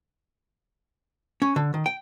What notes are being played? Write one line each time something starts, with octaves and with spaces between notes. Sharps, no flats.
C#4
D3
D#3
G5